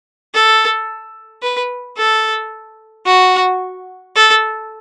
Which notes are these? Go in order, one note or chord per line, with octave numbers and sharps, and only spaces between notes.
A4
B4
A4
F#4
A4